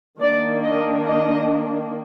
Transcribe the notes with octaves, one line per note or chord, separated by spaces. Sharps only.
D#3 A#3 D4 D5
D#5
D#5